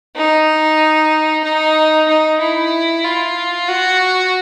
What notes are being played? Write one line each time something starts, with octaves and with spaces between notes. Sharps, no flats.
D#4
D#4
D#4
E4
F4
F#4